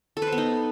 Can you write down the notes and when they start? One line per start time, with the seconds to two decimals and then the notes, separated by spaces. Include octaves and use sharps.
0.17 A4
0.22 B4
0.27 C5
0.32 B3
0.38 D#4